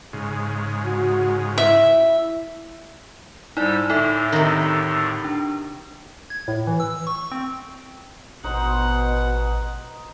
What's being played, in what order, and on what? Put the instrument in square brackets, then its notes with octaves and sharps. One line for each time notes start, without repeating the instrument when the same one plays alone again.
[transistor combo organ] G#2 C#3
[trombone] F#4
[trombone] E4 [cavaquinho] E5
[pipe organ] G#2 G3 E6 [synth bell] D#4 E4 D5
[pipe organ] A2 D3 [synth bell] D#4 A4 E5
[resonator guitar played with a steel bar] C3 D#3
[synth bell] D4
[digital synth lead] G#6
A2
E3
E6
C#6
C4
[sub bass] A1 [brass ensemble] B2 [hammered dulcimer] D#4 C5 [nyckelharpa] F#5